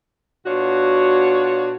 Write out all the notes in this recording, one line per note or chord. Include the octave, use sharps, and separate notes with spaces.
B2 D4 F4 F#4 C#5